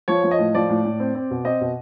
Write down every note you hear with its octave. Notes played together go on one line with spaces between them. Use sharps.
F3 C#5
F3
D#5
A2
F3 D5
A2
A2
C4
C4
B2
C4 D#5
B2